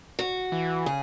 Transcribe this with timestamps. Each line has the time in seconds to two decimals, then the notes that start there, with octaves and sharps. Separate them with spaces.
0.19 F#4
0.52 E3
0.86 C#3 G#4